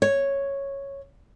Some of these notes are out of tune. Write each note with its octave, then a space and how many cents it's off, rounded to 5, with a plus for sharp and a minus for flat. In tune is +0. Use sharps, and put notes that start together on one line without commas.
C#5 -5